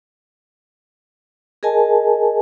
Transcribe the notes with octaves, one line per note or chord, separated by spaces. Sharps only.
G#4 A#4 D#5 G#5 A5